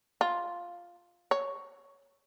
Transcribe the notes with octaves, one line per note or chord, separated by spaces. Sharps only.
F4
C#5